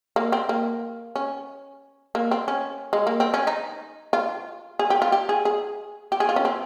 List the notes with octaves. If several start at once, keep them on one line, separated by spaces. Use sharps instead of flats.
A#3
C4
A#3
C#4
A#3
C4
C#4
G#3
A#3
C4
C#4
D#4
F4
G#4
G4
F4
G4
G#4
G#4
G4
G#4
F4
C#4
C4